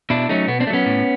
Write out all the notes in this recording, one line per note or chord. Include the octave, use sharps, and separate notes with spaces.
B2 D4 E4
F#3 A3 C#4 D#4
B2 B3
C4 D4
A3
F#3 B3 C#4
A2